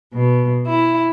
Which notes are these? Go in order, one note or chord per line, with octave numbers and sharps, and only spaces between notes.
B2
E4